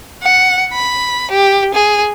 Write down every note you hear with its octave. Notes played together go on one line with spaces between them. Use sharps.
F#5
B5
G4
G#4